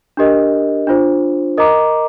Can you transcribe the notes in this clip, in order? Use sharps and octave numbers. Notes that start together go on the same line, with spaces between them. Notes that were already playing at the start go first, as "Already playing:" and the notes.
D4 G4 A#4 D#5
D4 F4 C5
A#4 D#5 A#5 D6